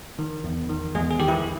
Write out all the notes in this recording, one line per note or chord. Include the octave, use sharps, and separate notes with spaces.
D#3
E2
D#3
E2 G#3 G#4
G#4
D#3 G4
E3 E4